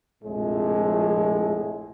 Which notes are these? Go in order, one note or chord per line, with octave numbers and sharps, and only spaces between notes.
A#1 F2 A2 C3 G#3